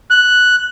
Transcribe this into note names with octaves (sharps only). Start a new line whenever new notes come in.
F#6